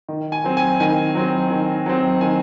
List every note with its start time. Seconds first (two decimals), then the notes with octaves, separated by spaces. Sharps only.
0.09 D#3
0.32 G#5
0.44 F#3 C4
0.57 G#5
0.80 D#3 G#5
1.15 F#3 C4
1.50 D#3
1.86 F#3 C4
2.21 D#3 G#5